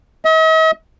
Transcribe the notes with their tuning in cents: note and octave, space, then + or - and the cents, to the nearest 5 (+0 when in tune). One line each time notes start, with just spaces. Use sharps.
D#5 +45